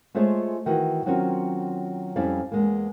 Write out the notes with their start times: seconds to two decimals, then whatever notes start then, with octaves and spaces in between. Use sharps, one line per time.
0.15 G#3 A3 F4 G#4 C5 C#5
0.66 D#3 E3 F#4 B4
1.06 D#3 F#3 C4 C#4 F4 F#4
2.16 F2 G3 C#4 E4 D5 F5
2.52 E2 G#3 A#3